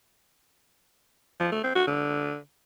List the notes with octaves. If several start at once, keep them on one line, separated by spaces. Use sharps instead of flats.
F3
A3
C4
F#4
D3